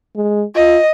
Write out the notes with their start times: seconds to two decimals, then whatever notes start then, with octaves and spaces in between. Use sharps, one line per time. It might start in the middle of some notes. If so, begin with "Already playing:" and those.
0.16 G#3
0.56 F4 D#5